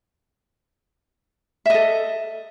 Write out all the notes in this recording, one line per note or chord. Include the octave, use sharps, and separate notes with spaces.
A4 D#5 E5